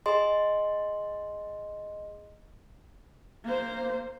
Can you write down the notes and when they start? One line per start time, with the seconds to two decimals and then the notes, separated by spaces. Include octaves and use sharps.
0.06 G#4 D#5 C6
3.44 A#3 C5